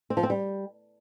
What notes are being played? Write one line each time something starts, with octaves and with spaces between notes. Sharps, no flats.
C4
F3
C4
G3